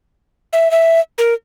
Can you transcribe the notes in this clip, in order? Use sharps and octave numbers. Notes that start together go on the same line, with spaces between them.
E5
E5
A#4